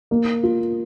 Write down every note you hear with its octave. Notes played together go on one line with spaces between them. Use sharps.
A#3
F4